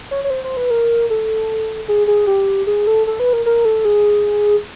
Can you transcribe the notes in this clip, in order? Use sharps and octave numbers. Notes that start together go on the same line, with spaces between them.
C#5
C#5
C5
C5
B4
A#4
A4
G#4
G#4
G4
G#4
A4
A4
B4
A#4
A#4
A4
G#4